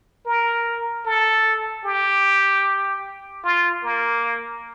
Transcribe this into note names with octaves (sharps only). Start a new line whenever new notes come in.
A#4
A4
G4
F4
A#3